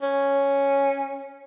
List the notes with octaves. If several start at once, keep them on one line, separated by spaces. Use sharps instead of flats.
C#4